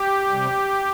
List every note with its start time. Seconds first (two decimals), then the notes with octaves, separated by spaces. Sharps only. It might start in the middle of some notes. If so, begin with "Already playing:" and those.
Already playing: G4
0.30 C3 G3